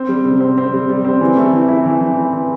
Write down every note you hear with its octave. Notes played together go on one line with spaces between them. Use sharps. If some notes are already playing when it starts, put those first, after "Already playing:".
Already playing: C4
G3
C3
C4
C4
G3
G3
C4
E3
A3
E3
E4
E3
E3
E4
E3